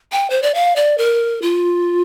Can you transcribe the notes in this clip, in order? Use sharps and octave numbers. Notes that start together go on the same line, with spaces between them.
G5
C5
D5
F5
D5
A#4
F4